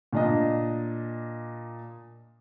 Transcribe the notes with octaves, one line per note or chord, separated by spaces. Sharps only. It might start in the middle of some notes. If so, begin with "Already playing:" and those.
A#2 D4 D#5